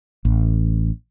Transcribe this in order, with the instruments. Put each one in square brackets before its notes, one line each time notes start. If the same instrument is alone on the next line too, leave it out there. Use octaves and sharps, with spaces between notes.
[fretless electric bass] A1